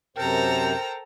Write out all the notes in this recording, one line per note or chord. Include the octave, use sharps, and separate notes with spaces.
F#2 C3 A4 A#4 C5 G5 A#5